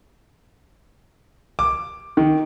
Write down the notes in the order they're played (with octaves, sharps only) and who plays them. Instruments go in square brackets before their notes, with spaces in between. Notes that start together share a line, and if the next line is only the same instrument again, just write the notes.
[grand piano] D6
D#3